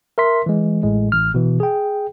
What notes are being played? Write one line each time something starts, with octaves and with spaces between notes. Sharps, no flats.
A#4 E5 C6 B6
E3 G#3
A1 A2 G#3
A1 F6
B2 E3
G#4 G5